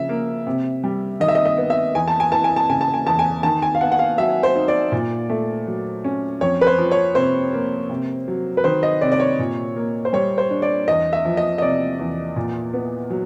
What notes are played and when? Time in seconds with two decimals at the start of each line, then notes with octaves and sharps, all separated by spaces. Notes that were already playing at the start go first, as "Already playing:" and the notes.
Already playing: C#3 F3 E5
0.09 A#3
0.47 C3
0.84 G3
1.20 D#3 D#5
1.28 E5
1.35 D#5
1.45 D#5
1.58 B3
1.70 E5
1.95 E2 G#5
2.08 A5
2.20 G#5
2.32 E3 A5
2.44 G#5
2.56 A5
2.69 C#3 G#5
2.81 A5
2.94 G#5
3.06 E2 A5
3.19 G#5
3.43 D#3 A5
3.62 G#5
3.75 F5
3.81 B3 F#5
3.92 F#5
3.99 F5
4.18 F#3 E5
4.43 C5
4.55 D#4
4.68 D5
4.92 A#2
5.30 A3
5.67 F#3
6.04 C#4
6.41 F2 C#5
6.61 B4
6.67 C5
6.78 F3
6.91 C#5
7.15 C3 C5
7.53 A#3
7.90 C3
8.28 F#3
8.57 B4
8.64 D#3 C5
8.83 D#5
9.01 C3 D5
9.12 D5
9.20 C#5
9.39 A#2
9.76 A#3
10.05 C5
10.13 G3 C#5
10.38 C5
10.51 D4
10.62 D5
10.88 E2 D#5
11.13 E5
11.25 F3
11.37 D#5
11.58 D#5
11.62 C3 D5
11.99 E2
12.36 A#2
12.73 B3
13.10 F#3